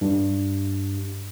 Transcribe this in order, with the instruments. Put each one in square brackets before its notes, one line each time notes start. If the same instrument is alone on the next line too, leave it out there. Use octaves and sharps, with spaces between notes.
[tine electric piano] G2